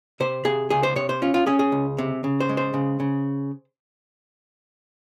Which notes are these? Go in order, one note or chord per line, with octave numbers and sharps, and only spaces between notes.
C3 C5
C3 G#4
C#2 G#4
C5
C3 C#5
C5
C#4 F4
F4
C#4 G#4
G#4
C#2
C3
C#3
C5
G#3
C5
C#3
C#3